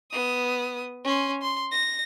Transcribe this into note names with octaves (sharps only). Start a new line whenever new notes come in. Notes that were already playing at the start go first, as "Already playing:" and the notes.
B3 D#6
C#4 C6
C6
A#6